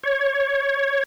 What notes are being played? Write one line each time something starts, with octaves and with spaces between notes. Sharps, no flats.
C#5